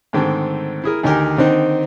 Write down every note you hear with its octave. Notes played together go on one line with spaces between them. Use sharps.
G#2 D3 D#3 A3 C4
E4 G#4 A#4
D2 D#3 D#4 G4 A#4 G#5
D3 D#3 C4 D#4